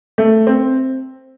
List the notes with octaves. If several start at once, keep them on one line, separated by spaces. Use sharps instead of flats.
A3
C4